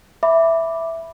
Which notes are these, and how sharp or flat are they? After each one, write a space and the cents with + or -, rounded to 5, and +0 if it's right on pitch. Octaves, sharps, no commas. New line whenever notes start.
E5 +0 B5 +0 D6 +0